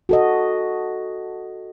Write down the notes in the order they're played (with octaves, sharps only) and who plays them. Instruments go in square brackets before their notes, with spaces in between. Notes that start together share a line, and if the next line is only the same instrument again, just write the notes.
[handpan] F#4 A4 D#5